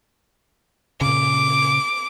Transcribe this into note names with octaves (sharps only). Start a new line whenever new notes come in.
A#2 C#3 D6